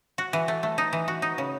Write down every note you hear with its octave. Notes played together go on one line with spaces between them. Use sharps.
F#4
E3
A3
A3
D#4
E3
F#4
D#4
C#3